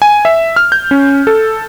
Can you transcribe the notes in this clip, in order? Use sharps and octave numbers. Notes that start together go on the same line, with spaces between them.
G#5
E5
F6
G6
C#4
A4